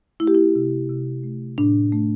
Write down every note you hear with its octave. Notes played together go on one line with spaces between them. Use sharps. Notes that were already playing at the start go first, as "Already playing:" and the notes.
A3 E4
G4
E4
C3
C3
A3
A2 D4
A3